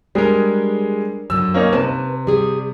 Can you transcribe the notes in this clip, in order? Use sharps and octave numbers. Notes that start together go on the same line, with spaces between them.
G3 G#3 D4 G#4 A#4
F#2 D3 E6
A#3 C#4 D#4
C3 B4 A5
G3 G#4